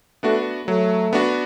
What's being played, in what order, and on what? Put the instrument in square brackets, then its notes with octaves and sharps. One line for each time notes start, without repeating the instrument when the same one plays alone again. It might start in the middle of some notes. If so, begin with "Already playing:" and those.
[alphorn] A3 [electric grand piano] B3 D4 F#4
[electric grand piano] F#3 [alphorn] A3
[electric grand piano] B3 D4 F#4